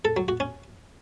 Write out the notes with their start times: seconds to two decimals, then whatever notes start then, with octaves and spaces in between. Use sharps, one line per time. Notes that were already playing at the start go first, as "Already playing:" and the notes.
0.05 A4
0.17 F#3
0.28 F#4
0.40 C#4